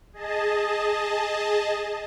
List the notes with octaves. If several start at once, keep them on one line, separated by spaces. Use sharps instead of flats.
G#4 D#5 A5